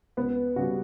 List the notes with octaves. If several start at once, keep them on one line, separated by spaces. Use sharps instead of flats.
C#2 B3 B4
C#3 G3 F#4